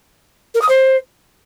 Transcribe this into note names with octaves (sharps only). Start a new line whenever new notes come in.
A#4
D#6
C5